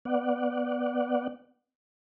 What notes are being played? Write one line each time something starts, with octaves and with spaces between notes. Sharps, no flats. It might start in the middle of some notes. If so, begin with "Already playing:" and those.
B3 D5 F#5